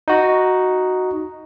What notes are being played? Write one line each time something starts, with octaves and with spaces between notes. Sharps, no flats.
D#4 F#4